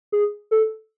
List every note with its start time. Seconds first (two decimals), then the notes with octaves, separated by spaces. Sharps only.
0.12 G#4
0.51 A4